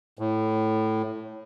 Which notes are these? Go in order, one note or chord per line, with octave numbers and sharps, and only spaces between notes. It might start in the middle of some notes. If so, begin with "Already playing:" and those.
A2